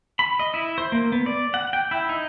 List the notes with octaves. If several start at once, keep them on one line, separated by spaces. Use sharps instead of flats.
B5
D#5
E4
C5
A#3
B3
D5
F#5
G5
E4
D#4